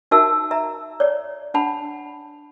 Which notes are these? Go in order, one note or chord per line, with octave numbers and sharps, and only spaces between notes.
D#4 F#4 A#4 E5 A5 E6
E5 A#5
C#5 D5
D4 F#5 A5 B5